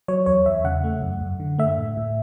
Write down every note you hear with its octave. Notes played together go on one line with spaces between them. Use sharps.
F#3 C#5
E2 C#5
E2 E5
C#3 F#5
A3
F#2
F#2
D3
A3 E5
A2
A2